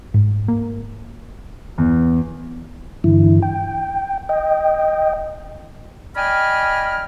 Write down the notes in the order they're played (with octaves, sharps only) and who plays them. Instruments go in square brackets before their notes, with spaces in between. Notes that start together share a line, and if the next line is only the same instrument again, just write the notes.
[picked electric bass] G#2
A#3
[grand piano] E2
[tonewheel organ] G2 D3 E3 E4
G5
D#5 G5
[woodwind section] D5 D#5 G5 G#5 B5 F6